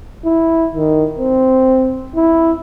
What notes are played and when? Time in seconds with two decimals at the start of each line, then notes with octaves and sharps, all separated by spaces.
0.25 E4
0.75 D#3
1.19 C4
2.16 E4